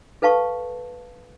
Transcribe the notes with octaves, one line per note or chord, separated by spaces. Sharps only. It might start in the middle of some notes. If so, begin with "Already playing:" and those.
A4 B4 F5 A5 C#6